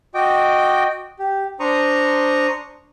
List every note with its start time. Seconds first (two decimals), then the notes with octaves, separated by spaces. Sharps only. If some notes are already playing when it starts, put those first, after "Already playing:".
0.15 F#4 D#5 G5 D6
1.19 G4
1.60 D4 C5 A#5 C#6 D#6